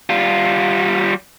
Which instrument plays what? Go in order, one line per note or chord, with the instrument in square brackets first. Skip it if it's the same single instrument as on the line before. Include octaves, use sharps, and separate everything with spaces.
[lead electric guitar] G3 F4